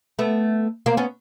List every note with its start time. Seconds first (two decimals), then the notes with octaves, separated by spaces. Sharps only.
0.19 A3 B3
0.86 A#3 C4
0.97 B3 C#4